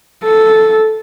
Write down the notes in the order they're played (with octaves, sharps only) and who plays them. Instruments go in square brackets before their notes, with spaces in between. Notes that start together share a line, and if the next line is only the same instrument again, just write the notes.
[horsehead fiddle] A4